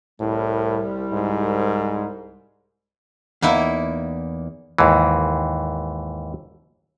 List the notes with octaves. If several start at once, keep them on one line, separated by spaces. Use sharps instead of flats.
C2 A2 G3
G#2
E2 A#3 D#4 E4
D#2 G#2 E3